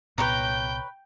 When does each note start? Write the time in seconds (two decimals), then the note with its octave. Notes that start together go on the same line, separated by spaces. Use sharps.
0.18 C2 A#2 B3 B4 C#5 G5 A#5 G6